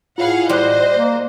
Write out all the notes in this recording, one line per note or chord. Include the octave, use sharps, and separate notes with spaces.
A2 F4 G#4 C#5 F5 F#5 B5
G3 C5 D#5 C6 F#6
A#3